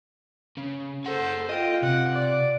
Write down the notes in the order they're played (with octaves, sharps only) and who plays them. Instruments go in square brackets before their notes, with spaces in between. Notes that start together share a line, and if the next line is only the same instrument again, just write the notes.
[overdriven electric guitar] C#3
[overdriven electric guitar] G#4 F#5 [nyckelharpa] A4 C5
[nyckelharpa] F4 G5 [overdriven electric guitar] D#5
[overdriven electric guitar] C3 [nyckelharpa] F#5
[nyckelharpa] D5